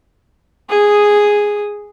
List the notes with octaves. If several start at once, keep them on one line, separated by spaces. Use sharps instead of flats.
G#4 D#6